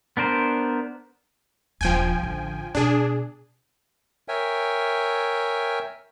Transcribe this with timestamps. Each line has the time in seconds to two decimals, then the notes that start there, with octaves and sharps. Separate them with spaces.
0.17 B3 D4 A#4 C5
1.81 D#1 F3 D4 G5 G#5
2.19 A1 D3
2.75 B2 D4 G#4
4.28 A#4 C#5 E5 G5 G#5